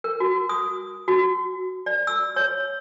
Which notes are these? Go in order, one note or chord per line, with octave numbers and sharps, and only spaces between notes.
A#4
F#4
D#6
F#4
D5
E6
C#5